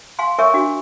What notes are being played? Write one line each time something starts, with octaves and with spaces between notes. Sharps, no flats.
F5 G#5 C6
A#4 C#5 E5 G#5 C#6
D4 F#4